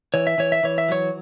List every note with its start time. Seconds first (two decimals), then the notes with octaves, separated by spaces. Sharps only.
0.14 E3 C#5
0.27 E5
0.38 E3 C#5
0.52 E5
0.63 E3 C#5
0.78 E5
0.89 F#3 C#5